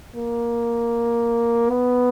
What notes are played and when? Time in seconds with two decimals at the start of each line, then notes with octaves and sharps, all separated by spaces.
0.16 A#3
1.70 B3